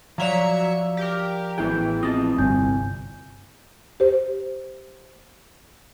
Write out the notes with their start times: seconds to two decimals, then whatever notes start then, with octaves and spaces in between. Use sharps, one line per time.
0.18 F3 F#3 D5 E5 F5 A#5 C#7
0.97 G4 A#4
1.58 A1 E3 B3 E4 G#4 G5
2.03 C4 F4 D#5 A5
2.38 G1 C2 G#5 G6
4.00 G4 C5